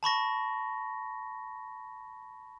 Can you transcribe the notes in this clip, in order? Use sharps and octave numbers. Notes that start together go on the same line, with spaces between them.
A5 B5 C#6 A#6